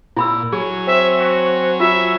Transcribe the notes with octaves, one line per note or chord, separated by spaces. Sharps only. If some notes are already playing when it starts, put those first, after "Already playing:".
A#2 E4 B5 E6
F#3 G#4 C#5 G#5
C4 E5
F#4
F4 E5